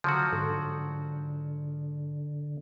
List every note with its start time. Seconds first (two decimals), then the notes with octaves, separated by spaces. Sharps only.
0.04 D3 F3 F#3 F#4
0.33 G#2 D3